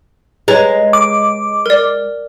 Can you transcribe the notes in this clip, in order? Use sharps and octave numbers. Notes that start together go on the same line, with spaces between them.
G#3 B4 C#5 A#5
D6
A#4 D5